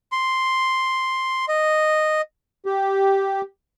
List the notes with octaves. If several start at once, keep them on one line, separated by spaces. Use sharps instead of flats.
C6
D#5
G4